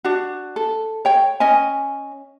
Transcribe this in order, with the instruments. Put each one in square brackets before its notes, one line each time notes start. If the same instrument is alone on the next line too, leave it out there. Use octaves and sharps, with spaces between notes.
[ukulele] D4 F#4
A4
C#5 G5
C#4 D#5 G#5